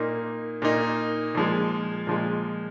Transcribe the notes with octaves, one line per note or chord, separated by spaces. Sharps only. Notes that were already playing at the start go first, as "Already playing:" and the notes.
Already playing: A#2 A#3 D#4
A#2 A#3 D#4
A#2 F3 G#3
A#2 F3 G#3